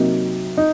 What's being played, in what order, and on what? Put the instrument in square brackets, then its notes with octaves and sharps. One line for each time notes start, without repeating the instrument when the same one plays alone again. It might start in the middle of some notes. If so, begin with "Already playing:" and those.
Already playing: [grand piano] C3 F#3 A#3 D#4
D#4